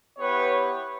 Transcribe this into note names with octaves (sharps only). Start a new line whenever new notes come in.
B3 E4 G4 B4 C#5